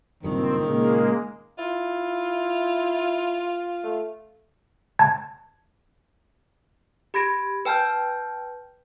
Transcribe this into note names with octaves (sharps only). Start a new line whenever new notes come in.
F#1 G2 A#2 D#3 C4
A#2 C#3 G#3 A#3
E4 F4
A3
A5 G#6
G4 B5 G#6 A#6 D7
B4 G5 A5 F6 G6